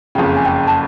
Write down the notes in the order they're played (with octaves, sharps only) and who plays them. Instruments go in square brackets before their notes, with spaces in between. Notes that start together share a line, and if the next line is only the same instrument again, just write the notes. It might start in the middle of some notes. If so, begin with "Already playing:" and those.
[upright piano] F#1 F2 C#3 [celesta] G5
[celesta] G#5
G5
A5